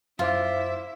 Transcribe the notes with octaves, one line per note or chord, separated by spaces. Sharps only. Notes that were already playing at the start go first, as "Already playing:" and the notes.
F#2 E4 F4 C5 E5 D6